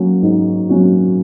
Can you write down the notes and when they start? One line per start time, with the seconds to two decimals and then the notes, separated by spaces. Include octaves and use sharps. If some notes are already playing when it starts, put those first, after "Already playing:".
Already playing: F#3 A#3 C#4 F#4
0.22 G#2
0.69 F#3 A#3 C#4 F#4